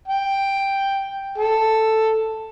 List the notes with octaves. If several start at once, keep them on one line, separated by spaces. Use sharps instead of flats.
G5
A4